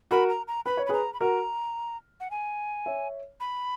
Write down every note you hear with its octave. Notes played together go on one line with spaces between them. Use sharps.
F#4 A#4 B5
A#5
A#5
B4 B5
C#5
B5
G#4 B4 A#5
B5
F#4 A#4 A#5
F#5
G#5
C#5 E5
B5